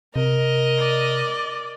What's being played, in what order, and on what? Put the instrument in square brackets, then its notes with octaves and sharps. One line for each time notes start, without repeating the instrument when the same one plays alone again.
[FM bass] C3 [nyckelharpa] A#4 [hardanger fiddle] D#5
[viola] D5